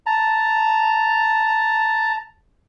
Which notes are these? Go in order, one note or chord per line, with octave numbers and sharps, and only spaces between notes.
A5 A#5